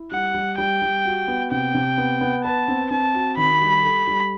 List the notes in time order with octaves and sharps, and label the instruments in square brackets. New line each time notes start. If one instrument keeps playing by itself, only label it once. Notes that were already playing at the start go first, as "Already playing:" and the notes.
Already playing: [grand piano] E4
[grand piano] G3 [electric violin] F#5
[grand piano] G3
[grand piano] G3 [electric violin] G5
[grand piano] G3
F#4
B3
[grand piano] C3 [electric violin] G5
[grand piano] C3
B3
B3
[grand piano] B4 [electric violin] A5
[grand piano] C4
[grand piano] C4 [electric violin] A5
[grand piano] F#4
[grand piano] D#3 [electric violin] B5
[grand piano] G3
A4
G3